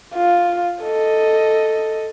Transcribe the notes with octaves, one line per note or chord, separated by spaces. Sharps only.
F4
A4 D#5